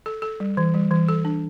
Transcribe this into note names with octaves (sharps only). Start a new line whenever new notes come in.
A4
A4
G3
E3
G3
E3
A4
D4